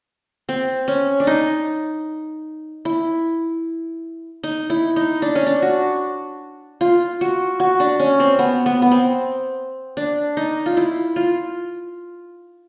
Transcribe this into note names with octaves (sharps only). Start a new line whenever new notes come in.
C4
C#4
D4
D#4
E4
D#4
E4
D#4
D4
C#4
D4
F#4
F4
F#4
F#4
D4
C#4
C4
B3
B3
B3
C4
D4
D#4
F4
E4
F4